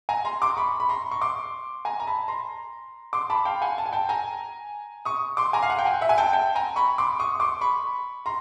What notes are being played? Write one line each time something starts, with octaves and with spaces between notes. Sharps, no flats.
G#5 A#5
A#5 C6
C6 D6
B5 C#6
B5
A#5 C6
C#6
C6 D6
G#5 A#5
A#5
A5 B5
A#5 C6
C6 D6
A5 B5
F5 G5
F#5 G#5
A5
G#5
G5 A5
G#5 A#5
C#6 D#6
C6 D6
G#5 A#5
F5
F#5
G5
F#5 G#5
E5 F#5
G#5
G5 A5
G5 A5
G#5 A#5
B5 C#6
C6 D6
C#6 D#6
C#6
C6 D6
B5 C#6
A#5 C6